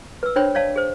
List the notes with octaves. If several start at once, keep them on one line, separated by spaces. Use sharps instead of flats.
B4 E6
D4 C5 C#5 G5 B5
C#5 D5 F5 A5
G#4 C5